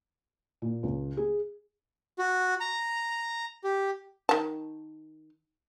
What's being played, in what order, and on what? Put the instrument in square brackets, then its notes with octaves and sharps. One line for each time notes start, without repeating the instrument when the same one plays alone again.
[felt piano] A#2
C#2
G#4
[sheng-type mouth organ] F#4
A#5
G4
[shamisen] D#3 A5